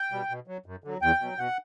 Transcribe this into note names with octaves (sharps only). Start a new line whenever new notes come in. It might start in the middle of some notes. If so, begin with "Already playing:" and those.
Already playing: G5
B2 G3
B2
F#3
F#2
D3 F#3
E2 G5
B2 F#3
B2 F#5